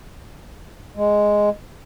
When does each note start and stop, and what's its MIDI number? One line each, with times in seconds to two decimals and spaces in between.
0.96 1.49 56